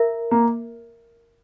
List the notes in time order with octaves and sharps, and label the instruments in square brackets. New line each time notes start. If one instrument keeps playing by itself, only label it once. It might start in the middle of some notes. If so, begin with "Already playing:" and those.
Already playing: [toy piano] A#4 E5 A#5
[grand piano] A#3